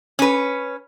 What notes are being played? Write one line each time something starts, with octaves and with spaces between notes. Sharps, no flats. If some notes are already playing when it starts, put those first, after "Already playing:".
C#4 B4